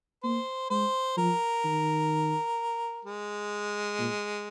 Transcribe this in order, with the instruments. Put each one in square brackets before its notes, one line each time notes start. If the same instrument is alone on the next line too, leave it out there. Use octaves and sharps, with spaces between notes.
[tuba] A#3 [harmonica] C5
[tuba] G#3 [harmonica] C5
[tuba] F3 [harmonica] A#4
[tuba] D#3
[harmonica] G#3
[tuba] A#2